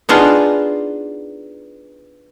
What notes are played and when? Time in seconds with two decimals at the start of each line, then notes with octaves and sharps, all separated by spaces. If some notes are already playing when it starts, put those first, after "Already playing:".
0.09 B3 D4 D#4 F4 G#4